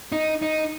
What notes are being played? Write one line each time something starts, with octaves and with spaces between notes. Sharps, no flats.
D#4
D#4